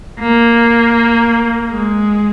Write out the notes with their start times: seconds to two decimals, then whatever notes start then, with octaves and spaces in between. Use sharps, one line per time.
0.20 A#3
1.70 G#3